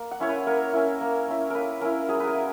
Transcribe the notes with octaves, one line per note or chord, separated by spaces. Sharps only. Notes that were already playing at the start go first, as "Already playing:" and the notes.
Already playing: A#3
F#5
C#4 E4 C#5
B4
A#3 A#4
C#4 E4
A#3
C#4 E4
A#3 A#4 B4
C#4 E4 A#4
F#3 G#4
B4
A#4
A#3